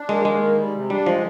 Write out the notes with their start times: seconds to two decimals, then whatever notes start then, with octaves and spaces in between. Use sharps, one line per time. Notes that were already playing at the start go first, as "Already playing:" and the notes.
Already playing: D4
0.09 G#3 A#3
0.25 D#3 G#3
0.41 A#3
0.58 G3
0.74 C3
0.90 G3 D4
1.06 F3 G#3